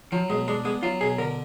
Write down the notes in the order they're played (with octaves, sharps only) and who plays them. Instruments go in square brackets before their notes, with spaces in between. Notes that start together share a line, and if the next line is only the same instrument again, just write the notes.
[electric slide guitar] F3 [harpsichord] F#3
[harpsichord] B2 [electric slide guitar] G#3
[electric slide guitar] G#3 [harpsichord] D4
[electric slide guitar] G#3 [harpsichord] B3
[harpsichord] F#3 [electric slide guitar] F4
[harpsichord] B2 [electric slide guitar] G#4
[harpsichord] D3 [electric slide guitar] A#4